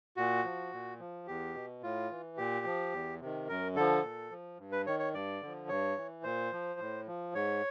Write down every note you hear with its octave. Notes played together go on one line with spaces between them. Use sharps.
A#2 F#4
F3
A#2
F3
E2 G4
B2
A2 F4
E3
A#2 G4
F3
E2
C3 D#3
F#2 A#4
D3 F3 A4
A#2
F3
G2
B4
D#3 C#5
C#5
G2 D5
D3 F3
G2 C#5
E3
A#2 C5
F3
A2
F3
G#2 C#5